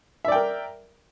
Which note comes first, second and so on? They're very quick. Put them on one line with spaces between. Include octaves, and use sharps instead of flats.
E5 D5 G5 A#4